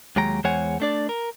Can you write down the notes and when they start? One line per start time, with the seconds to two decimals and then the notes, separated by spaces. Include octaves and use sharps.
0.16 D#2 F#3 G#3 G5 A#5
0.44 E2 G#3 C5 C#5 F#5 G#5
0.80 A3 D4 D5
1.09 A#4